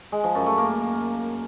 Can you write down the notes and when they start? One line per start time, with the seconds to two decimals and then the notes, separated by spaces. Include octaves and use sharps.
0.12 G#3
0.24 F3
0.35 F#2
0.46 A3
0.58 A#3